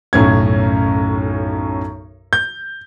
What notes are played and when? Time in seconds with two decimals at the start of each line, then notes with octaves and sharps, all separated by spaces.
0.13 B1 F#2 A2 C#4 G#6
2.33 G6